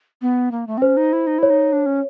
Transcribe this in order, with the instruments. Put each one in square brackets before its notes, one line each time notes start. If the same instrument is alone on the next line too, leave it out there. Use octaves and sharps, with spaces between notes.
[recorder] B3
A#3
A3
C4
[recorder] C#4 [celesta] C5
[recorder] D#4
E4
D#4
[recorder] E4 [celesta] C#5
[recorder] D#4
D4
C#4